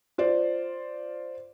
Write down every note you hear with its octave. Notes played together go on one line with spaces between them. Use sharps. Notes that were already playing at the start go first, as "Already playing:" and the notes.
F4 C5 D5